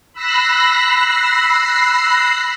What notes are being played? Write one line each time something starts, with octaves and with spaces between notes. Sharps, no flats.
B5 E6 F#6 A#6 C7